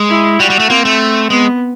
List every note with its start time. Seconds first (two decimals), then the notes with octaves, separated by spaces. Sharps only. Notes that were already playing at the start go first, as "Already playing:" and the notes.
Already playing: G#3
0.09 E4
0.40 G3 F#4
0.50 G3
0.60 A3
0.70 A#3 C4
0.85 A3
1.30 G#3 B3